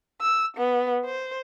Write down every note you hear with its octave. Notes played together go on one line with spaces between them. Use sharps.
E6
B3
C5